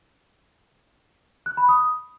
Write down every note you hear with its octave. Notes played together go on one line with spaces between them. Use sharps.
F#6
B5
D#6